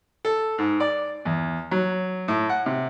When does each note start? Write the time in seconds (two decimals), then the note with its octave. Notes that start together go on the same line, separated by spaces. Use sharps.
0.25 A4
0.58 G#2
0.80 D5
1.25 E2
1.71 F#3
2.28 A2
2.49 F#5
2.66 C3